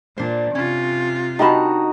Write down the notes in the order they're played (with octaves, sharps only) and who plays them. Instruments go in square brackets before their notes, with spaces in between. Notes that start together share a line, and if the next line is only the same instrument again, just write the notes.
[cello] A#2 [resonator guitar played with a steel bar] D4 C5
[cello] C3 F4 [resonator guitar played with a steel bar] C#4
[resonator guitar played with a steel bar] D4 A#4 A5 [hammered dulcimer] D#4 F#4 [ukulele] G4 D#5 B5